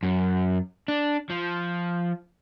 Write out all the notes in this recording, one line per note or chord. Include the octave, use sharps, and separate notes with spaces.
F#2
D4
F3